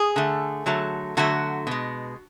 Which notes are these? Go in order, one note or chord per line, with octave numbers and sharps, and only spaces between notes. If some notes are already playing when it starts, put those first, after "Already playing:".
Already playing: G#4
D3 A3
D3 F#3 A3
D3 F#3 A3 F#4
B2 G#3